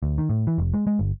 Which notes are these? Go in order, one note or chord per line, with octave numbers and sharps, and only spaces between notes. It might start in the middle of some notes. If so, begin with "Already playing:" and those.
D2
D#3
A2
E3
F1
G#3
G#3
G1